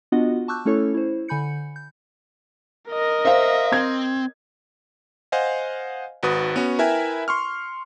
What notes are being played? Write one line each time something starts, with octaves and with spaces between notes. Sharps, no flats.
B3 D4 F4 F#4 D#5 F#5
A5 C#6 D6 E6 F#6 G6
A3 C#4 E4 A4 C#5 C#6
E4 C5
D3 G#5 B5 G6 C#7
G6
A#4 D#5
C5 E5 F5
C4 G#6
C5 D#5 F5 F#5 G#5
G#1 F#4 B4 D#6
B3 C#4 F#4
E4 A#4 B4 E5 G5 G#5
C6 C#6 F6